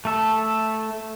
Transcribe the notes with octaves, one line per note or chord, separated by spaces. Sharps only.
A3 A4